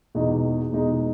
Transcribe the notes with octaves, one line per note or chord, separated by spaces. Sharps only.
E2 B2 G#3 D#4
E2 B2 G#3 D#4